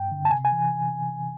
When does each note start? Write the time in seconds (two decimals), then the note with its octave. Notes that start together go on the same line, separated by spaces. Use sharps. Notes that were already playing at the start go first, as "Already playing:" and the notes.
Already playing: G2 G5
0.11 D3
0.25 A5
0.31 C3 G#5
0.45 G#5
0.52 E3